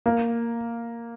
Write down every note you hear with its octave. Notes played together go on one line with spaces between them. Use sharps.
A#3